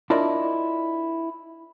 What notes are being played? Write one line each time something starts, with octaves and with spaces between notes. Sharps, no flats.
D4 E4 F4 A#4 D5 D#5